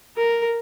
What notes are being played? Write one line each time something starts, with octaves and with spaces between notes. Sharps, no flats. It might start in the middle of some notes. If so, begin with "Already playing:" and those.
A#4